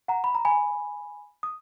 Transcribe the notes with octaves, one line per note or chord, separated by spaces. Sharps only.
F#5 A#5
B5
A#5
G#5 B5
D#6